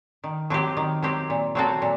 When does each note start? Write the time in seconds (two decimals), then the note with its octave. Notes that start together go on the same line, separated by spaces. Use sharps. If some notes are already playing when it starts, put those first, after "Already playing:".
0.24 D#3
0.50 F#3 C4 G4
0.77 D#3
1.03 F#3 C4 G4
1.30 A#2
1.55 F#3 C4 F#4 A4
1.82 A#2